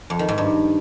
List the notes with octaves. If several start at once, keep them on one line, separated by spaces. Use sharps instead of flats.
F2
D#3
G#2
G2